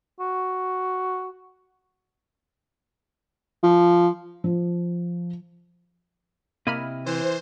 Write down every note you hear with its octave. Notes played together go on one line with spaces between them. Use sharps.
F#4
F3
F3
C3 A#3 E4 D#5 B5 F6
E3 C5